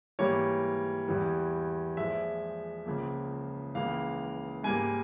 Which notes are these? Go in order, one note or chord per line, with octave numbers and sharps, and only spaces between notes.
G#2 E3 G3 A#3 C#5
E2 E3 G3
A#2 F3 G#3 E5
C#2 C#3 F3 A#3
C#2 C#3 E3 A#3 F5
G#2 G3 A#3 G#5